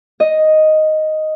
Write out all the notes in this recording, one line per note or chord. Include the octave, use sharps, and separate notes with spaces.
D#5